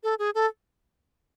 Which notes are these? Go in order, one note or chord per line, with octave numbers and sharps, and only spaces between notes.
A4
G#4
A4